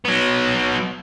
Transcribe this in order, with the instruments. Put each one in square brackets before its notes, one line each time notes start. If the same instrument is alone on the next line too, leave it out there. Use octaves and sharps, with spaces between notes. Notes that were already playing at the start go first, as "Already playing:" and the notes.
[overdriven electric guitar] F#3 B3